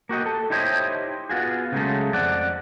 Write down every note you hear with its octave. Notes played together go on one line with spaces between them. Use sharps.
A#3 F#4 G4 D#5
A4
D#4 E4 G4 C5 C#5 D#5
B3 F4 F#4 G#4
C#3 F#3 G#3 A3
F2 D5 F#5